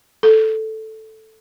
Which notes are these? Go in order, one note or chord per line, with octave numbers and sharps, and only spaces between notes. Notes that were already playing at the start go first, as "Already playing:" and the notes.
A4